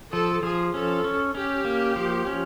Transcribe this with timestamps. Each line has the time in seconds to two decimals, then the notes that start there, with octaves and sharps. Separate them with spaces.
0.12 F3 A4
0.43 F3 G#4
0.74 C#4 A4
1.04 C#4
1.35 C#4 G4
1.65 A#3
1.96 F3
2.27 C#4